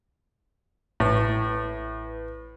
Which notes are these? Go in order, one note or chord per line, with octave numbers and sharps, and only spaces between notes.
A1 A2 B4